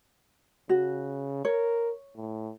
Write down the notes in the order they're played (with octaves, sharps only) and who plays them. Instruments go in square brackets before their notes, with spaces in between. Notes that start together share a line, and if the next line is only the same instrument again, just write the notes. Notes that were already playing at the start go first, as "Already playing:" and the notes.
[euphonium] C#3 [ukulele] F#4
[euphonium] A#4 [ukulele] C#5
[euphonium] A2